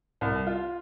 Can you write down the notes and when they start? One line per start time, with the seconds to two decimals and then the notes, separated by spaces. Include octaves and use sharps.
0.21 C2
0.47 F4